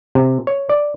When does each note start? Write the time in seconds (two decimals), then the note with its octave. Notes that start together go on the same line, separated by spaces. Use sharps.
0.15 C3
0.47 C#5
0.69 D5